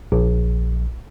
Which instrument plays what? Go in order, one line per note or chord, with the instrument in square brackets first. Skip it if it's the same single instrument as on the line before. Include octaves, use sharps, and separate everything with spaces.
[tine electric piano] A#1